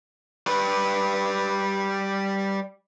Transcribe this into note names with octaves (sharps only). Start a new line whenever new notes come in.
G3 B4